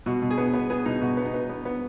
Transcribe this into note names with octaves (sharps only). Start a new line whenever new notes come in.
B2 F#4
B2
G#4
B3
B3 B4
B3 G#4
B2 D#4
B2 F#4
B3
D#4
B3
B3
B3